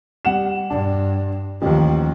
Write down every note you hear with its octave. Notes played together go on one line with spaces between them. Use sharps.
G3 F#5 E7
G2 D4
A1 D#2 D#3 F3